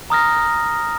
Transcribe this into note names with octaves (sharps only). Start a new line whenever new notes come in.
A#5 D#6 F6 A#6